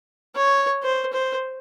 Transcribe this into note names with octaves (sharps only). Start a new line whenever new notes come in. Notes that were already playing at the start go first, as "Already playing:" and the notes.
C#5
C5
C5